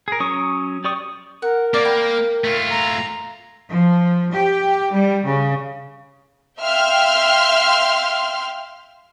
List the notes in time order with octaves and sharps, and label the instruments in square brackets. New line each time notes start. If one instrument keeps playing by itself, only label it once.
[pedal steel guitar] G#4 A#4
F#3 C#4 C#6 D#6
G4 D5 C#6 D#6
[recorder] A#4 [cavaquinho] F#5
[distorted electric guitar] A#3 [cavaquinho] D5
[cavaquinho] G5 B5
[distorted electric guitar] A3 F4
[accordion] A#5
[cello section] F3
G4
G3
C#3
[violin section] E5 F5 G5 C6 F6